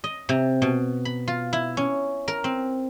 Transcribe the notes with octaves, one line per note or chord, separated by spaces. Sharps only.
D#5
C3
B2
B5
F4
E4
C#4
A#4
C4